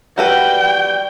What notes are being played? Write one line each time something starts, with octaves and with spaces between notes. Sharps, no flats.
G3 F#4 B4 G5